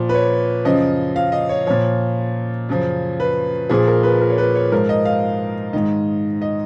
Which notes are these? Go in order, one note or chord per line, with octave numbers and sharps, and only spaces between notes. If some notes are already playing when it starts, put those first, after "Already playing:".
Already playing: A#2 F3
B4
C#5
F#2 C#3 F3 D#5
F5
D#5
C#5
A#2 F3 C#5
F#2 C#3 F3
B4
A#2 F3 G#4
A#4
B4
A#4
C#5
B4
C#5
G#2 F3 A#4
D#5
F5
G#2 D#3 D#5
D#5